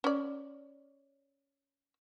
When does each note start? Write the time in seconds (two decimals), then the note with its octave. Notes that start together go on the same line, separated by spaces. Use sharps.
0.04 C#4 D5